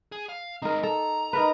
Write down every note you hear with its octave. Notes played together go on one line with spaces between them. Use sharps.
G#4
F5
G#3 C4 D#4 A#4
A4 A#5
D#4 A#4 B4